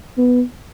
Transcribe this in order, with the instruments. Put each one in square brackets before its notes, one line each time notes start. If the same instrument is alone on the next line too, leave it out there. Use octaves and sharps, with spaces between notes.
[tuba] B3